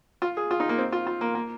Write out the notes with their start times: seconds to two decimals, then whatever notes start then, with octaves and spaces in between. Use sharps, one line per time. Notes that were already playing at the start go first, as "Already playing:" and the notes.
0.22 F4
0.37 G#4
0.51 F4
0.60 D#4
0.69 A#3
0.78 C4
0.92 F4
1.07 F4
1.21 A#3
1.35 A#3